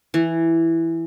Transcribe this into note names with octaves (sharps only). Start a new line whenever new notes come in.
E3